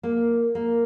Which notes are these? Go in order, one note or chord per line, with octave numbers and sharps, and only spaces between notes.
A#3
A#3